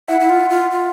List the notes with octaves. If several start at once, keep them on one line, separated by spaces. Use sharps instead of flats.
E4 E5 F#5
E4
F4
F4
F4